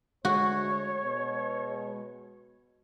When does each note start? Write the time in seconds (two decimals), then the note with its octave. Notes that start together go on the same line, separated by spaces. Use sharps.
0.25 D2 G#3 F#4 C#5
1.04 B2